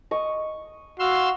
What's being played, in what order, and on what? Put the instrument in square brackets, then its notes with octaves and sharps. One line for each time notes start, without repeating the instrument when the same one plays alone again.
[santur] D#5 C#6
[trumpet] F#4 [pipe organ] F5 C6 E6